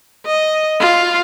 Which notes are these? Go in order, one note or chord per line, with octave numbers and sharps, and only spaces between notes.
D#5
F4